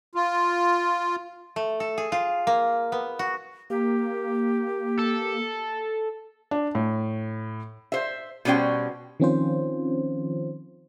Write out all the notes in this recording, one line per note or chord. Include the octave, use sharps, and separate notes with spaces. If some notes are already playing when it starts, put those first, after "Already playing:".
F4
A3
A4
G#4
F4
A#3
B3
F#4
A#3 G4
A4
D4
A2
C5 E5
B2 G3 C#4 C5 G5
D#3 F3 C4 C#4 F4 C5